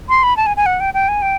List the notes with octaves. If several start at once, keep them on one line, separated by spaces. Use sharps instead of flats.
C6
B5
A5
G#5
G#5
F#5
G5
G5
G#5
G5